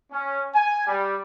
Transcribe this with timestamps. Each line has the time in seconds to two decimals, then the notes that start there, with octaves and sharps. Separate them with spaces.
0.12 C#4
0.53 G#5
0.86 G3